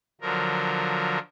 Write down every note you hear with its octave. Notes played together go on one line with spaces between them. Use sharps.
D3 F3 F#3 A#4